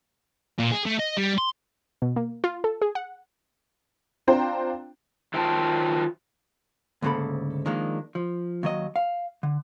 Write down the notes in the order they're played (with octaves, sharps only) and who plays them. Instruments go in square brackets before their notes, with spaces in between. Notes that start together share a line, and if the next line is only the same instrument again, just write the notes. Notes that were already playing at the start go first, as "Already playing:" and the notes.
[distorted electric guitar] A#2
G#4
A3
D#5
G3
C6
[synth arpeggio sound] B2
A#3
F4
A4
G#4
F#5
[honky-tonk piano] C4 D4 F4 C5 G5 A#5
[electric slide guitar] D#3 F#3 F4 C5 G5 A5
[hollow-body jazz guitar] D2 G#2 C#3 A#3 A4 B5
D#3 F3 G#3 A#3 D4
F3
D#2 F#3 D#5
F5
D3